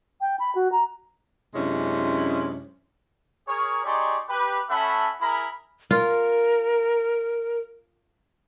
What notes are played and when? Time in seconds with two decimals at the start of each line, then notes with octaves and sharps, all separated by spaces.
0.21 G5
0.39 B5
0.55 F#4
0.72 A#5
1.55 F#2 C3 G#3 C#4 D4 E4
3.47 G#4 A#4 C#5
3.84 D#4 G4 G#4 D5 C6 C#6
4.29 G4 B4
4.69 A3 C#4 E5 F#5 A5 B5
5.21 E4 G#4 A#4 A#5 B5
5.91 F4 A#4